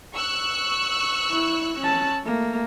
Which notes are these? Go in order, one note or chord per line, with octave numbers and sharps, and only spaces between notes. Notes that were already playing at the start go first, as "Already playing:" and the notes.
C#6 E6 F#6
E4
C#4 A5
A3 A#3